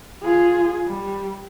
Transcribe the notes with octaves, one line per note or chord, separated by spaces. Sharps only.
F4 G#4
G3